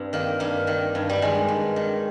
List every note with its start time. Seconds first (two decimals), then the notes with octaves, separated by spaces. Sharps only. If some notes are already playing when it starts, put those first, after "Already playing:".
Already playing: G2 C4
0.13 D#3 A#3
0.40 G2 A#3
0.67 D#3
0.95 G2
1.10 G3
1.22 D#3 G#3
1.48 G2
1.76 D#3